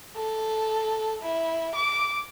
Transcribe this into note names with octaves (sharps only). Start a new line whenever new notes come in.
A4
E4
D6